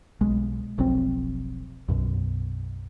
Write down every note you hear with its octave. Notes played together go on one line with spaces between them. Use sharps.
B1 G#3
F1 B1 F2 C4
B1 F#2 B2